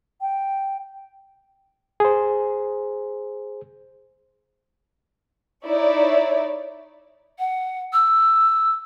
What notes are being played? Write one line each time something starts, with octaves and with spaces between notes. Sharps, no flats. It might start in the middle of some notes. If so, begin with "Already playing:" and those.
G5
G#4 C5
D#4 E4 C#5 D5
F#5
E6